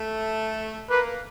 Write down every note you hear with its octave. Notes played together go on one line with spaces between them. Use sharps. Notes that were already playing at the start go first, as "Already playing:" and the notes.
Already playing: A3
A#3 B4